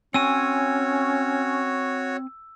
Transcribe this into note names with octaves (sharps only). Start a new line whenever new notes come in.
C4 C#4 F#4 C#5 G#5 E6